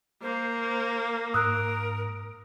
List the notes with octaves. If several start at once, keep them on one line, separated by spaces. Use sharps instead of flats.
A#3 C5
G#2 A#4 D#6 E6 F#6